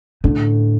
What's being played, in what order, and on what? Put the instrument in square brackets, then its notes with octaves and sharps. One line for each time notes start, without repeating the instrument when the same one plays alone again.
[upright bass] A2 [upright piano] D3